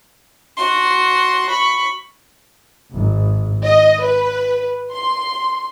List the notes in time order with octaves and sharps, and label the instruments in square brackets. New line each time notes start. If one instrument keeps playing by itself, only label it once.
[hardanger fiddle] F#4 C6
B5 C#6
[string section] G#1
D#5
B4
C6